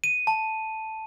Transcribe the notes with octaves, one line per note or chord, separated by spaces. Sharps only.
D#7
A5